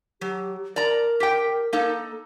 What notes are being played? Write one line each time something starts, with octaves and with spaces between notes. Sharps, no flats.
F#3 G4
A#4 D5 A#5
G4 G5
A#3 D#4 A4